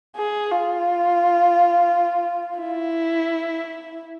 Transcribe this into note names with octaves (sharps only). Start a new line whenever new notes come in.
G#4
F4
E4